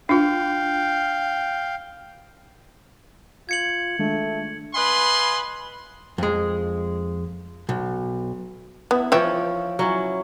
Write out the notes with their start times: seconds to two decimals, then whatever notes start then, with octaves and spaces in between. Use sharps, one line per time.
0.09 D4 F4 F5 G5
3.49 F4 G#6 C#7 F#7
3.99 D#3 G#3 A3 D4
4.74 B4 D#5 F5 G#5 B5 C6
6.18 F2 G#3
7.69 B1
8.91 B3 E4
9.12 E3 F3 C#5 E5 G5
9.79 F#3 C#4 E4